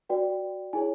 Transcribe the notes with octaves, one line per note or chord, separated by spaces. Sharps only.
F#4 B4 D5 G5
E4 G#4 C#5 G#5